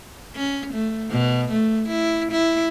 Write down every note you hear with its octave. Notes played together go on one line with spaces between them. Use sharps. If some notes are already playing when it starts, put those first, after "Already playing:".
C#4
A3
B2
A3
E4
E4